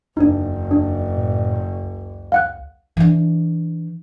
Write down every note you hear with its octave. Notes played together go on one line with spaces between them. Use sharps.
F#1 E2 D4 D#4
D4
A2
C#2
F5 F#5 F#6
E3 D4